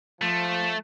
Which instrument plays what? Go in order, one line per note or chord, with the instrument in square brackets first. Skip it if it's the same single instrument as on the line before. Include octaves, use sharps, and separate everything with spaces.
[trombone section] F3 [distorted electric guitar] A3